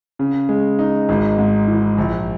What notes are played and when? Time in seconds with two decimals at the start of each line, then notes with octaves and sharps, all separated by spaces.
0.19 C#3
0.49 G#3
0.79 D#4
1.09 G#1
1.38 G#2
1.67 E3
1.98 A#1